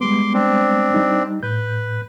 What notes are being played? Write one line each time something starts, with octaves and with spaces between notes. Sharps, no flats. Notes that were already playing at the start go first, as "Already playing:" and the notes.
G3 G#3 B3 C6 D6
C4 D4
G3 D#4
A2 B4 G6